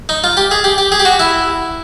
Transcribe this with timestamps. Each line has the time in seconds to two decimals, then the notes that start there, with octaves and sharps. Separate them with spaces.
0.09 D#4
0.24 F4
0.37 G4
0.51 G#4
0.64 G4
0.78 G4
0.92 G#4
1.00 G4
1.05 F#4
1.19 E4